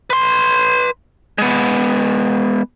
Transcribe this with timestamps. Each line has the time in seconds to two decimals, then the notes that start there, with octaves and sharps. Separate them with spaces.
0.10 B4 C6
1.38 G#3 B3